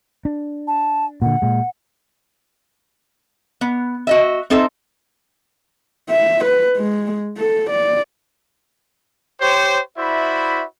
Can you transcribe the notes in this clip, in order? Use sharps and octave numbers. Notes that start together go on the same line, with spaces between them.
D4
A5
A#2 D3 F#5
A#2 G#3
B3
F#4 D#5 E5
C4 D#4 A4 C5 E5
E5
B4
G#3
A4
D5
G4 C5 C#5
E4 F#4 C5 D5 E5 B5